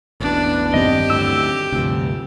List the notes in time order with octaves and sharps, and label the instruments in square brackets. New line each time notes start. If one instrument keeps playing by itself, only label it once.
[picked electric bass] A1 E2 B2 [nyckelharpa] D4 B4
[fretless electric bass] G2 D#3 C4 [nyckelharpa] G4 [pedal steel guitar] D#5
[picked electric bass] D2 A2 [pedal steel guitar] E6
[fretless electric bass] D2 G2 [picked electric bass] C3 F3